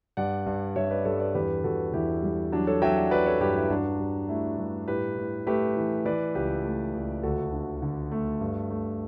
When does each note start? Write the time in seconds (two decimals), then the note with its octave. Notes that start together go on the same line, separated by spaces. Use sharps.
0.17 G2 D5 F#5
0.46 G2
0.76 G2 C#5 E5
0.91 B4 D5
1.05 G2 A4 C#5
1.20 B4 D5
1.35 E2 G4 B4
1.64 E2 F#4 A4
1.93 E2 E4 G4
2.23 G3
2.52 F#3 D4
2.67 A4 C#5
2.82 F#3 E5 G5
2.97 D5 F#5
3.11 F#3 B4 D5
3.26 A4 C#5
3.40 G2 G4 B4
3.55 E4 G4
3.70 G2 D4 F#4
4.00 G2
4.29 A3 E4 G4
4.58 G2
4.88 A2 G4 B4
5.17 A2
5.47 A3 G4 B4
5.76 E3
6.05 E3 B4 D5
6.35 C#2 G4 B4
6.65 A3
6.94 C#2
7.23 D2 F#4 A4
7.53 D3
7.82 D3
8.12 A3
8.41 G2
8.70 A3